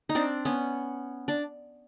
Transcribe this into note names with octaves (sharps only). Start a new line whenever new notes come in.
D#4
C4 D4
B3 C#4
D4